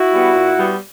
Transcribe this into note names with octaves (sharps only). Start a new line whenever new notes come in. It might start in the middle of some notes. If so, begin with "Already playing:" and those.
Already playing: E4 F#4
G3 B3
A#2
G3 B3